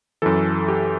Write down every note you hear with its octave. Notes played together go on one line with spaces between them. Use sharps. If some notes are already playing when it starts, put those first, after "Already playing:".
F#2 E3 A4
G4